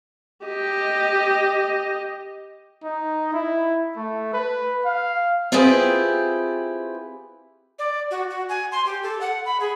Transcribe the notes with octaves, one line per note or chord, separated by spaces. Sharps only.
G4 D#5
D#4
E4
A3
B4
F5
C4 E4 F4 G4 G#4 B4
D5
F#4
F#4
G#5
C6
G4
A4
F#5
B5
G#4